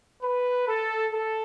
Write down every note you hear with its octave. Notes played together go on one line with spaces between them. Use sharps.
B4
A4
A4